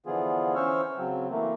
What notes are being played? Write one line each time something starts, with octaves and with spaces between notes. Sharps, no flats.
D3 E3 F3 B3 F4 G#4
E3 C#4 C5 C#6 E6 F6
C#3 F#3 C4
E3 A3 A#3